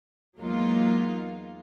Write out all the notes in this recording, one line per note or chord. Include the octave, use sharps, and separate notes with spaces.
E2 F#3 G#3 A#3 D#4 F4